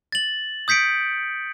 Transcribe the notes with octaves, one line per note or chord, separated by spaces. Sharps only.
A6 F#7
D#6 G6 B6 C#7 D7